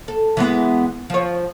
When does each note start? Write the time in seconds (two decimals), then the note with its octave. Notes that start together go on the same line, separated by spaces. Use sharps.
0.08 A4
0.37 E3 G#3 B3
1.10 F3 C#5